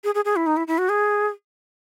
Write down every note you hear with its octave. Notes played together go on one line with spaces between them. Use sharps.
G#4
G#4
G#4
E4
D#4
E4
E4
F#4
G#4